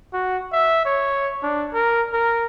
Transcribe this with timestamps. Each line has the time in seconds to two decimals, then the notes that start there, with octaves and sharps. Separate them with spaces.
0.13 F#4
0.53 E5
0.85 C#5
1.43 D4
1.74 A#4
2.13 A#4